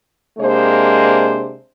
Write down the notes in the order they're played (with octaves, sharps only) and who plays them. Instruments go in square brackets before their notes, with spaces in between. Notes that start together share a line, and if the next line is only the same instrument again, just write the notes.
[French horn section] C3 G#3 A#3 D4 C5